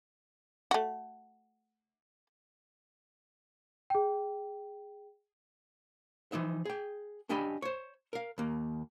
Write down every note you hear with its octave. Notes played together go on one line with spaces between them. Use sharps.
A3 F#4
G#4 G5
E3 F3 D#4 E5
G#4 G5
C#4 D4 G4 D#5 G#5 B5
C5 C#5
A#4 F5
D#2 A#3